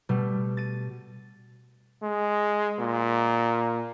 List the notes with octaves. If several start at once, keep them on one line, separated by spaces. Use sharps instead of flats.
B2 G3 A3
A6 D#7
G#3
A#2